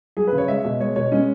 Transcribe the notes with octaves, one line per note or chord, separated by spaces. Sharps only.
F#3 G#4
B4
C#3
C#5
G#3 E5
B2
G#3 C#5
B2 C#5
G#3 C#4